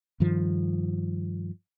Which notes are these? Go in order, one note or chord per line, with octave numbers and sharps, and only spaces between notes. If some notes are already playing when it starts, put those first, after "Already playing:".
G2 D#3 F3